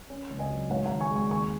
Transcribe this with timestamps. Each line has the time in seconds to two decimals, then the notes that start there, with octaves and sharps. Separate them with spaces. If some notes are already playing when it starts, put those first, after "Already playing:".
0.10 C#4
0.30 C#2
0.39 D#5 G#5
0.50 F#3
0.70 G#2 C#5 F#5
0.86 F#5 A#5
0.90 D#3
1.00 G#5 C#6
1.11 G#3
1.16 G#5 C#6
1.31 D#2 G#5 C#6